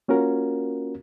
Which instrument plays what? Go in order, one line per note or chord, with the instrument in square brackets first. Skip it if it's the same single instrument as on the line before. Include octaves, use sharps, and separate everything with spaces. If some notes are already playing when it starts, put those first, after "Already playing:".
[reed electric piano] A#3 C#4 F4 F#4 A#4